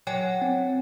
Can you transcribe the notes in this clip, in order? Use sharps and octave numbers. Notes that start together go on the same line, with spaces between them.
F#3 C#5 D5 G5 G#5
C4